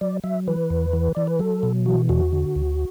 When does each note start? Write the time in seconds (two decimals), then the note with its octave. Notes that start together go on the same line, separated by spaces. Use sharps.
0.01 F#3 D5
0.24 F#3 E5
0.48 E3 B4
0.70 E2
0.93 E3
1.15 E3 D5
1.27 B4
1.39 F#3 A4
1.63 B2
1.86 E3 F#4
2.09 E2 F#4
2.33 D3
2.55 D2